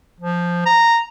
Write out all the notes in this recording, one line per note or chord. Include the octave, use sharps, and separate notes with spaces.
F3
A#5